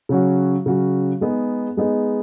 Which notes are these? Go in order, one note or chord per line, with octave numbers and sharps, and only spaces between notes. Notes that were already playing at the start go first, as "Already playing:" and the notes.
C#3 F#3 C#4 F#4
C#3 F#3 C#4 F#4
G#3 B3 D#4 G#4
G#3 B3 D#4 G#4